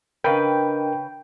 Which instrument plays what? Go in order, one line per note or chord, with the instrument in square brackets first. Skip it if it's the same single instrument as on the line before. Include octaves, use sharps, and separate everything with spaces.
[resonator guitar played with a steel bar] C#3 B4 [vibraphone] D4 D#5 [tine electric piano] A#4 [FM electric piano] G5